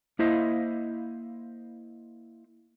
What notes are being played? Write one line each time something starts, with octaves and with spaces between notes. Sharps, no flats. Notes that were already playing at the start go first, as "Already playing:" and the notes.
A#3 E4 C5 D#5 F5